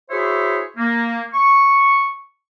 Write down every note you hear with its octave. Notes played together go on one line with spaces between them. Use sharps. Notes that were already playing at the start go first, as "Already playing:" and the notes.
E4 F#4 G#4 C5 C#5 E5
A#3
C#6